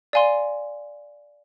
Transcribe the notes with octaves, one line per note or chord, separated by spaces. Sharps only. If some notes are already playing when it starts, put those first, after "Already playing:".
D5 F5 G#5 C6